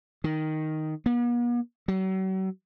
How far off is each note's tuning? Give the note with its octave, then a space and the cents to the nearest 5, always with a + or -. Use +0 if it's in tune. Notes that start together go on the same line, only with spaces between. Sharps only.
D#3 +0
B3 -45
F#3 +40